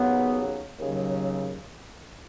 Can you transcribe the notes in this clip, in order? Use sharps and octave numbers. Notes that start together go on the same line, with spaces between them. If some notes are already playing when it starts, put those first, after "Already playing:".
Already playing: D#2 C#3 F#3 B3
D#2 C#3 F#3